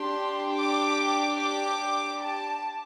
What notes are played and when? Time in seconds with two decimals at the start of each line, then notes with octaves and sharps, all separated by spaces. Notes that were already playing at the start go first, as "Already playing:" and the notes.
Already playing: D4 G4 C6
0.54 D6
1.39 D6
2.23 A5